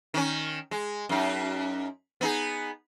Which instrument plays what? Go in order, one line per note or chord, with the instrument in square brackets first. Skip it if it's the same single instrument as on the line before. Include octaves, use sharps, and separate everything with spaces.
[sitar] D#3 C#4
G#3
F#2 D#4
B3 D#4 G#4